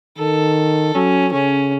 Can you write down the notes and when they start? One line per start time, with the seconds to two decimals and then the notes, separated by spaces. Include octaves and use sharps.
0.18 D#3 A4
0.95 F#3 C#4
1.32 C#3 C#4